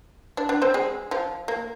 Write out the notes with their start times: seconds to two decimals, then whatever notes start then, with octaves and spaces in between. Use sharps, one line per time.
0.37 D4 D5
0.49 D4 D5
0.62 C4 C5
0.74 G#3 G#4
1.11 F3 F4
1.48 A#3